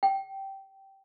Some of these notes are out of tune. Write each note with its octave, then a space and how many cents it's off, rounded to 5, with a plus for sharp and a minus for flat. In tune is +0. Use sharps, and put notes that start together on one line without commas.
G5 -15